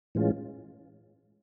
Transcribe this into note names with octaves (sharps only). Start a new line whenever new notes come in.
A2 E3 G#3 C#4 F4